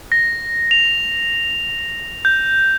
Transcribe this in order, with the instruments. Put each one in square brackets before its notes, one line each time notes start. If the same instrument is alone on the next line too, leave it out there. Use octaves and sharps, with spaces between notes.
[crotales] A#6
F7
G6